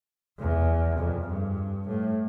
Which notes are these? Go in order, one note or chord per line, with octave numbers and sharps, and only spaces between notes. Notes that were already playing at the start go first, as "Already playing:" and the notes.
E2
F2
G2
A2